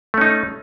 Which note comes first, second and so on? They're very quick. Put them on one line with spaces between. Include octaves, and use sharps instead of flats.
A3 C#4 D#4